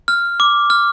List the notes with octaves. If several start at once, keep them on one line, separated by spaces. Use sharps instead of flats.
F6
D6
F6